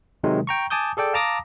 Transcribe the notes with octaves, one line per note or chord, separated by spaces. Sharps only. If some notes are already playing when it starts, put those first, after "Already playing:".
C3 D#3 F#3 G#3
G5 A#5 C#6
G#5 A5 D6 D#6 G6
G#4 A4 D5 G5
F5 A5 A#5 D6 D#6 A#6